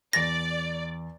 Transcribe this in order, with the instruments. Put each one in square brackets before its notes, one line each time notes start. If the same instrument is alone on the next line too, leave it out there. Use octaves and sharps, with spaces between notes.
[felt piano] E2 A6 [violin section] D5 [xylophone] A#6